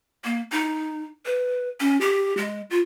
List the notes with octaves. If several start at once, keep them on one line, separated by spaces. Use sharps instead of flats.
A#3
D#4
B4
C#4
G4
G#3
F4